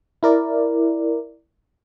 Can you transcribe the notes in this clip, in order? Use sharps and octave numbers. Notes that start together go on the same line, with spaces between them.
E4 A#4 D5